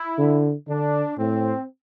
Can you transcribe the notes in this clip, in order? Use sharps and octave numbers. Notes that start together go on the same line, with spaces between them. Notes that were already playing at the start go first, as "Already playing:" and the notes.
Already playing: E4
D3
D3 D4
A2 C4